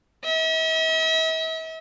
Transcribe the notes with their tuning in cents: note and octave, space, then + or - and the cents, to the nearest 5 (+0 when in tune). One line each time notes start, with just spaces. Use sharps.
E5 -45